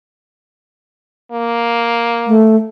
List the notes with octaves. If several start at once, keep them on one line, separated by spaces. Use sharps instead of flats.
A#3
A3